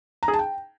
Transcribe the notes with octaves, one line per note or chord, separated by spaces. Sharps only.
A#5
G#4
A5
G5